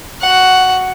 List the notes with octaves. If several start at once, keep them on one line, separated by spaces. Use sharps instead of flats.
F#4 F#5